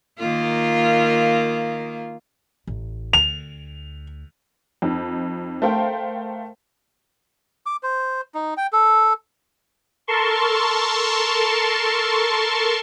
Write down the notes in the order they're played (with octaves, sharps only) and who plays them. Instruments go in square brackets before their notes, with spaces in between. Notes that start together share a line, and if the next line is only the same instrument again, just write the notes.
[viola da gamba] D#3 A#3 F4
[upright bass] A1
[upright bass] D2 [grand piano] F7
[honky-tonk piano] F2 D#4
A3 A#4 C5 F5 G5
[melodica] D6
C5
D#4
G5
A4
[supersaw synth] A4 A#4 A5 C6 C#6